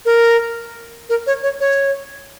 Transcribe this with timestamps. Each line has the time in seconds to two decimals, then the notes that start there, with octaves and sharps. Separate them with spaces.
0.05 A#4
1.09 A#4
1.27 C#5
1.43 C#5
1.60 C#5